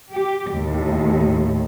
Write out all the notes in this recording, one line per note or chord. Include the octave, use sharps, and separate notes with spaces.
G4
D#2 A2